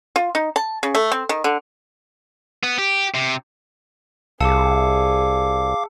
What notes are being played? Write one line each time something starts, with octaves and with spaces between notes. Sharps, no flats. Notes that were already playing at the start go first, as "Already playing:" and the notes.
F4
D#4
A5
C#3
A3
C4
D#3
D3
B3
G4
C3
C2 G#4 F5 A5 D6 E6 C#7